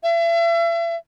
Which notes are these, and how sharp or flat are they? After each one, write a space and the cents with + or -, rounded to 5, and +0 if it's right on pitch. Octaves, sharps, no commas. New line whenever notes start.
E5 +40